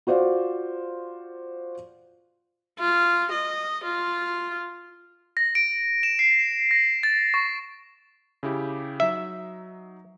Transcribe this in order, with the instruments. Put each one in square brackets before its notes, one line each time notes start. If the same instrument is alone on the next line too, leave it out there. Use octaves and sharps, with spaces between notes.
[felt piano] F4 F#4 C5 D5 F5
[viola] F4
D#5
F4
[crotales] A#6
D7
E7
C7
E7
A#6
A6
C#6
[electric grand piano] C#3 E4 G4
[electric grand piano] F#3 D#4 [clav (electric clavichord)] E5